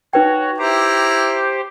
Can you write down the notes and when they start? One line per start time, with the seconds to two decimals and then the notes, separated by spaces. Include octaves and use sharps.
0.13 D#4 F#4 B4 C#5 G5
0.58 E4 G4 C5 A#5